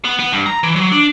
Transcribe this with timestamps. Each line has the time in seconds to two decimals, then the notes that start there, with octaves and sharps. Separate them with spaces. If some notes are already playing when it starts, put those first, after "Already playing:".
0.05 B3
0.19 B3
0.32 G2
0.46 A#5
0.63 E3
0.76 F#3
0.92 D4